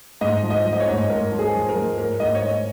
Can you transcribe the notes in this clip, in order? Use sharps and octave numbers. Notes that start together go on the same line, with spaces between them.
G#2 D#5
F3
D#5
F3
D#5
C#5
G#2
G#2 A#4
F3
G#4
F3
A#4
F3
G#2 A#4
G#2 D#5
C#5
G#2 D#5